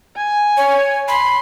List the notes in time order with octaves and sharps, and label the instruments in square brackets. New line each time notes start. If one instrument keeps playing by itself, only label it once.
[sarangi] G#5
[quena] C#5
[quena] B5 [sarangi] C6